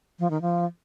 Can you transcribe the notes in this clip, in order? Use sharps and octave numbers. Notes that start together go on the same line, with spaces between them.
F3
D#3
F3